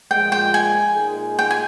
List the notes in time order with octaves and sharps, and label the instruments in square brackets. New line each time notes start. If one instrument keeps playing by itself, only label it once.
[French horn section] A#2 F3 G#3 [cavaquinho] G5
[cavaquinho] G5
G#5
[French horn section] A#2 G#3 D#4 G#4
[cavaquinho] G5
G#5